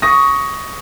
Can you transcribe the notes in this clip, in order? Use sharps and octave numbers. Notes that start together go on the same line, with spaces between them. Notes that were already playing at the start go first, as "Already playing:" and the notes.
C#6 D#6 A#6